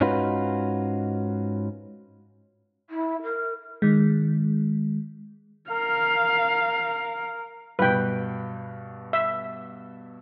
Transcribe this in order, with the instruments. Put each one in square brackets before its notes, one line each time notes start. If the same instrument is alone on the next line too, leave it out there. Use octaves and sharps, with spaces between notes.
[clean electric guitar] G#2 C#4 D#4 F4 F#4 B4
[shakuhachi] E4
A#4
[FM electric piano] D#3 G#3
[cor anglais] A#4 [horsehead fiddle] F5
[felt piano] G2 B2 [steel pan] B4 G5
[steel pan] E5